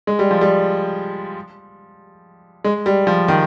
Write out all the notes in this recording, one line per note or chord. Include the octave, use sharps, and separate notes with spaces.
G#3
G3
F3
G3
G#3
G3
F3
D#3